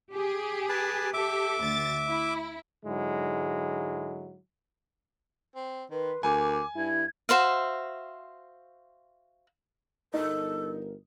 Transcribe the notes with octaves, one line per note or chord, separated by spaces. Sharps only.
G4 G#4
B4 G#5 A5
G4 A4 E5 D6
D2 A6
E4
G#2 D3 F#3 G#3 E4
C4
D#3 B4 C6
D2 A#4 G#5 D6
G2 E4 G#6
F#4 C5 E5 F5
G1 D#4 A4 A#4